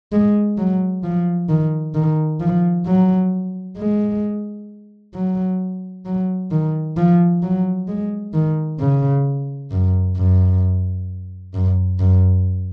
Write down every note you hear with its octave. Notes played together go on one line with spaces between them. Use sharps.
G#3
F#3
F3
D#3
D#3
F3
F#3
G#3
F#3
F#3
D#3
F3
F#3
G#3
D#3
C#3
F#2
F#2
F#2
F#2